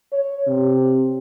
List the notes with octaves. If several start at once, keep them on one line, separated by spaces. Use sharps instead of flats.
C#5
C3